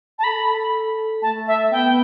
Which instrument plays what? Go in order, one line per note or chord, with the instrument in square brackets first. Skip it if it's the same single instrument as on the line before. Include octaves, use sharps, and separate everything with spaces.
[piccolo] A5
[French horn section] A4 [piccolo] B5
[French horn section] A3 [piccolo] A5
[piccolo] E5
[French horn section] B3 [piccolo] G5